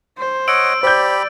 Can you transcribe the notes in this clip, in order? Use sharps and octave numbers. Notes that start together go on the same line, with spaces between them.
C5
C#5 D#5 F#5 E6 D7
G4 C5 D5 B5 G6